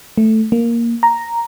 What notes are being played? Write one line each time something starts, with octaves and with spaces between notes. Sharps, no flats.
A3
A#3
A#5